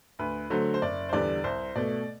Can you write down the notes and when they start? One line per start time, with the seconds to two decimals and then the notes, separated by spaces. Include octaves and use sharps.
0.19 D2 B4
0.50 D3 F#3 A3 C5
0.74 C5
0.82 F#1 D5
1.09 C5
1.13 E2 D3 G3 D5
1.44 C2 C5
1.76 B2 A3 D5